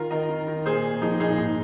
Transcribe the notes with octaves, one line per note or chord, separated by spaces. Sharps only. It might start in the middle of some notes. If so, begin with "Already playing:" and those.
Already playing: D#3 F4 A#4
D#3 A#4 D#5
D#3
D#3
A#2 G#4 C5
A#2
F3 D#4 G#4
A#2 D#4 G#4
G#2 D#4